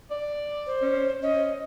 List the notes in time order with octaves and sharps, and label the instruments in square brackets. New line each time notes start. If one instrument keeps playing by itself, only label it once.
[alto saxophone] D5
[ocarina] C5
[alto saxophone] C#4
[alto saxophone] C#4 [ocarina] D#5